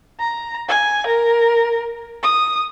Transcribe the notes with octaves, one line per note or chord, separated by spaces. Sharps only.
A#5
G#5
A#4
D#6